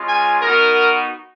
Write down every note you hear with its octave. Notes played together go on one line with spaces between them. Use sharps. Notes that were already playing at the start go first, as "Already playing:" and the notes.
Already playing: G#3 C#4 F4
G#5
B3 D#4 F#4 A#4